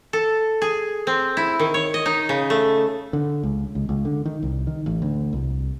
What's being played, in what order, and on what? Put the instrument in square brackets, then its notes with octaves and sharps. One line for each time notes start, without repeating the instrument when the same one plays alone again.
[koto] A4
G#4
C4
E4
D#3
C#5
D#5
D#4
C#3
A3
[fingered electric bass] D3
C#2
C#2
C#2
D3
D#3
C2
D#3
A1
D2
C2